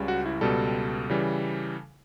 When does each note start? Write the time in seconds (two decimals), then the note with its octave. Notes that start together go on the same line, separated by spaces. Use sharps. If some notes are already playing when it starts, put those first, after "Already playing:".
Already playing: C#2 C#3 G3
0.08 F#4
0.26 E4
0.41 C#2 B2 G3 A4
1.10 C#3 E3 G3